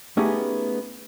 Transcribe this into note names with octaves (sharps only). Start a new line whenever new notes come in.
A3 B3 C#4 D#4 G4 G#4